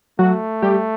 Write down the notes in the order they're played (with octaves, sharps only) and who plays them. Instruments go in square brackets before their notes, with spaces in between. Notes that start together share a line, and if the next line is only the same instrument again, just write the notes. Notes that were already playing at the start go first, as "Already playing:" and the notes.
[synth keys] F#3 F#4 [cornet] A3
[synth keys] G3 G4